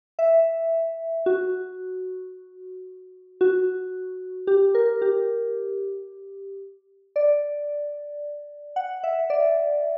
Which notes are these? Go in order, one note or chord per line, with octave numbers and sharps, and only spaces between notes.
E5
F#4
F#4
G4
A#4
G4
D5
F#5
E5
D5